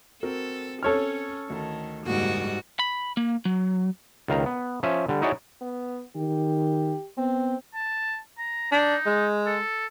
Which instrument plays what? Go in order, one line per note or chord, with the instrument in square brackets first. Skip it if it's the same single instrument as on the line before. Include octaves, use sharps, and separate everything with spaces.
[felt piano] C4 F#4 A#4 [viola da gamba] A4
[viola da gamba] C#4 [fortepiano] A4 C#5 F6
[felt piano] D2 A5 [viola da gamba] D#3
[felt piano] F#1 D#2 [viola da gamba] G#2 G3 F#4
[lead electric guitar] B5
A#3
F#3
[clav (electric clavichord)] C#2 D#3 F5 A#5
B3
F3 C#4 E5 G#5
D3 G3
D#4 E4 F#4 G#4 C#5 D5
[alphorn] B3
[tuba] D#3 [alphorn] G4
[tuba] B3 [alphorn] C4
[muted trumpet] A5
A#5
[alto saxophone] D4 [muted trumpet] D#4
[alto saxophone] G#3
[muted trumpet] A4